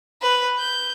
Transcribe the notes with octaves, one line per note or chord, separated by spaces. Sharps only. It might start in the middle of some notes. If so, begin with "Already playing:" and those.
B4
G6